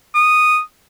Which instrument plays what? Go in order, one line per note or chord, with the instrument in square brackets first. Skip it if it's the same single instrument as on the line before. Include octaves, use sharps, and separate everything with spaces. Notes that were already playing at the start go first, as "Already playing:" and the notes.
[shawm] D#6